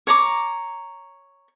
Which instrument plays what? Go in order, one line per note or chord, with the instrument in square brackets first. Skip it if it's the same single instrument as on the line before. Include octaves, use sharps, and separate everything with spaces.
[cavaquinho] C#5 A#5 D6